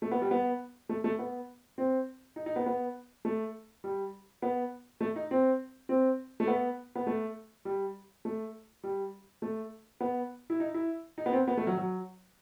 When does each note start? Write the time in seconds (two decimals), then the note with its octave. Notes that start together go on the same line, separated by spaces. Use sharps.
0.02 A3
0.11 B3
0.21 G3
0.31 B3
0.89 A3
1.04 A3
1.19 B3
1.78 C4
2.36 D#4
2.46 D#4
2.56 B3
2.66 B3
3.25 A3
3.84 G3
4.42 B3
5.01 A3
5.16 D#4
5.31 C4
5.89 C4
6.40 A3
6.47 B3
6.95 B3
7.07 A3
7.65 G3
8.25 A3
8.83 G3
9.42 A3
10.00 B3
10.50 E4
10.60 D#4
10.74 E4
11.18 D#4
11.26 B3
11.32 C4
11.48 B3
11.57 A3
11.67 F#3
11.78 F#3